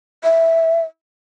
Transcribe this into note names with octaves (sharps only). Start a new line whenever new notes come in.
E5